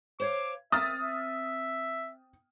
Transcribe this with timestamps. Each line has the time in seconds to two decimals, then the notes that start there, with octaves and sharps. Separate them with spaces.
0.20 C5 C#5 F5 D6
0.72 C4 E5 D#6 F6 A6
1.02 E5